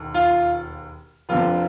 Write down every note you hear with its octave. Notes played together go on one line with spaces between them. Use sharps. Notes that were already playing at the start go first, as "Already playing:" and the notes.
Already playing: E1 D#2
F4
F1 F2 D3 F4